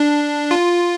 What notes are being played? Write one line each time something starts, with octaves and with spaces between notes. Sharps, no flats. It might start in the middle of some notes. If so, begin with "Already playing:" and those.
Already playing: D4
F4